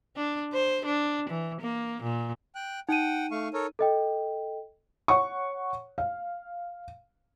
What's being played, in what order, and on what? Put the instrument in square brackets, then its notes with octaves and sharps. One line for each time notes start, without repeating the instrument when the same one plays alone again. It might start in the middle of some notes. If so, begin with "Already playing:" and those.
[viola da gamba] D4
C5
D4
E3
A#3
A#2
[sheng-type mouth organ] G5 F#6
[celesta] D#4 D#7 [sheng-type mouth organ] F#5 G5
[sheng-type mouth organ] A3 F5 C#6
A4 A#4 C#5
[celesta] A4 D#5 G5
[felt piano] C#5 F#5 C#6
F5